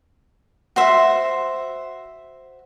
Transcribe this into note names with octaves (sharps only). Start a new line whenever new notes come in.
F#4 C5 E5